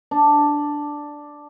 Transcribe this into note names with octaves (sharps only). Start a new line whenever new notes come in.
D4